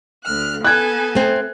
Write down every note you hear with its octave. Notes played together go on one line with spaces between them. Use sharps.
D2 F6 F#6
B3 A4 G#5 F#6 G#6
A3 C4